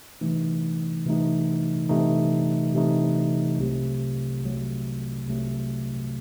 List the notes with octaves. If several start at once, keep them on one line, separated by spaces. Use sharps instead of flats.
C3 E3 A3 D#4
C3 E3 A3 D#4
C3 E3 A3 D#4
C3 E3 A3 D#4
C2 C3 F#3 A3
C2 C3 F#3 A3
C2 C3 F#3 A3